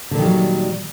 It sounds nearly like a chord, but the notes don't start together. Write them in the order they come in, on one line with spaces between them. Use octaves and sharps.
D3 A#2 D#3 G3 F#3